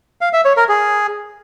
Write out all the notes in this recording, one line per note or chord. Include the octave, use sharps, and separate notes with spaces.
F5
E5
C#5
A#4
G#4